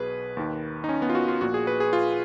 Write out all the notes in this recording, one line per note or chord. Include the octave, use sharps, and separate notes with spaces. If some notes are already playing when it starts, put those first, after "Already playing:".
Already playing: B1 B2 G#4 B4
D#2 D#3
D#4
C#4
B3
F4
F#4
F4
A#1 A#2 F#4
G#4
B4
G#4
F4